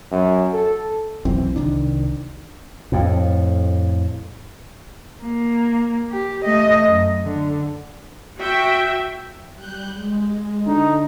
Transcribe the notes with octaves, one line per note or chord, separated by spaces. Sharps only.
F#2
A4
B1 F#2 E3 C4
C2 D#3 D4
F2 A2
A#3
G4
A3 D#5
F#2
D3
F#4 E5 G5
G3 F#6 G6
G#3
D3 D#4